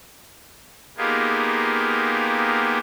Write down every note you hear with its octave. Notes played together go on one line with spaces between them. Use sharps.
A#3 B3 D#4 F4 G4 G#4